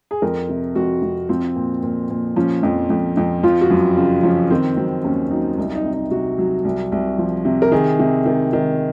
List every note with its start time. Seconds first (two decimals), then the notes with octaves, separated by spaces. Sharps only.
0.11 G#4
0.22 F2 A#4
0.49 C3
0.75 F2 F#4
1.02 F2
1.29 F3 C4
1.56 A#2
1.83 A#2
2.10 A#2
2.36 F3 C#4
2.63 F2
2.90 F2
3.17 F2
3.43 F3 F4
3.61 F#4
3.70 F#2
3.96 C#3 F4
4.23 F3 C#4
4.50 D#3 C4
4.77 F#3 C4
5.04 D#2 C#4
5.31 F#3 D#4
5.58 C2 D#4
5.75 D#4
5.85 C3
5.93 D#4
6.11 C3 F#4
6.38 F#3
6.65 C2
6.92 C2
7.18 F3
7.45 C3
7.62 A#4
7.72 D#3 G#4
7.99 C3
8.26 D#3
8.53 D#3